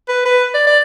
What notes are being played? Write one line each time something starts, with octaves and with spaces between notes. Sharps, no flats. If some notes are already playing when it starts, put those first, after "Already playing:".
B4
B4
D5
D5